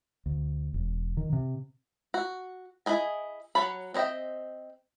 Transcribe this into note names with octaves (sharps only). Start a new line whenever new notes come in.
D2
E1
D#3
C3
F#4
E4 G#4 D#5 G#5
F#3 C#5 A5 B5
C4 C#5 D#5 E5 G5